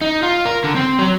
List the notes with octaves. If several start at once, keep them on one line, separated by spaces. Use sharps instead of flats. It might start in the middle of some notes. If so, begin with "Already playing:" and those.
D#4
F4
A#4
D3
C4
F#3